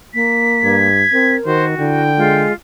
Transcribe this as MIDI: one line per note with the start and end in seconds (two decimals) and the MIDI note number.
0.14 0.88 58
0.14 1.36 95
0.64 1.04 43
0.64 1.38 92
1.13 1.37 60
1.13 1.65 70
1.46 1.75 51
1.46 2.03 66
1.46 1.66 72
1.78 2.46 50
1.78 2.11 64
1.78 2.47 79
2.17 2.53 56
2.17 2.54 65